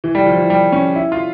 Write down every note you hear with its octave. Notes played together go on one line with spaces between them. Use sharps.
E3
G3
F3
E3
G3
C#4
E4
F4